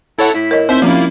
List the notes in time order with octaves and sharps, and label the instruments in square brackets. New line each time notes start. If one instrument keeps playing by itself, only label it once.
[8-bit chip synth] E4 C#5 F#5 [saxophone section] A4
[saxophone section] A2 E4 [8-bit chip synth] B6
[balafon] A#4 C#5 D#5
[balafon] C4 D#4 [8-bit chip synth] C5 E5 G6
[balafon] F3 C#4 [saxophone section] G3 F4 [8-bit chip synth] A#3 E4